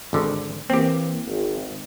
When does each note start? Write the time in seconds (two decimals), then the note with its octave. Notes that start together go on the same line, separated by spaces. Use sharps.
0.13 G#1 D3 D#3
0.70 E3 A#3 C4 G4
1.26 G#1